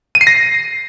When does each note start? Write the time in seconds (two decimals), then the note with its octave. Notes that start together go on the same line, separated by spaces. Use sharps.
0.15 D#7
0.21 C7
0.27 A#6